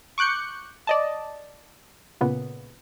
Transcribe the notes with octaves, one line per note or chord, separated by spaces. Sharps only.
C#6 D6 F#6 G6 C#7
D5 D#5 A5
A#2 C#3 B3